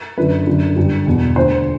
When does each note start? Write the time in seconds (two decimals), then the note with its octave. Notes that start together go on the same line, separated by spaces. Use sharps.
0.18 F#2 D3 B4
0.47 F#2 D3
0.77 G2 D3
1.06 E2 B2
1.36 D2 D3 C5